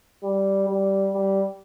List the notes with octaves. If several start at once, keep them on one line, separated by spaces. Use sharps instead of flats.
G3
G3
G3